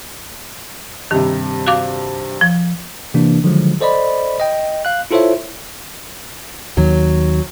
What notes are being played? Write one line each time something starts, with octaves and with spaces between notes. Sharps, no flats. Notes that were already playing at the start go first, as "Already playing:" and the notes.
G2 C3 D#3
F#4 F5 D6
F3
C3 E3 A#3 D4
D3 D#3 F3 F#3 G#3
A4 C5 D5 D#5 B5
D#5 G5
F5 F#6
E4 F4 A4 C5 C#5 E5
D#2 D#3 F#3